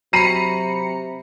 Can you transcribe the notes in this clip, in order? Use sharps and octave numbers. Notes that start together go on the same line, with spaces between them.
C3 F#3 A#5 B5 C7 C#7 D#7